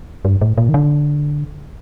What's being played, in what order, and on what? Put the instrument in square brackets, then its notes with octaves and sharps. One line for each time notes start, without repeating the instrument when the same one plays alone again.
[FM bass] G2
A2
A#2
D#3
D3